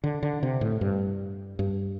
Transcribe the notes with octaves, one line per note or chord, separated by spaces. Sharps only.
D3
D3
C3
A2
G2
G2